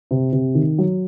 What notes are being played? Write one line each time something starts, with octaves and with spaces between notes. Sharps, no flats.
C3
C3
D#3
F#3